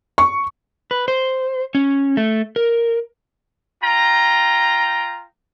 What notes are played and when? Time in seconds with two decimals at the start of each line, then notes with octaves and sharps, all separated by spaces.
0.18 C#6
0.91 B4
1.08 C5
1.75 C#4
2.17 A3
2.56 A#4
3.83 F4 G5 A#5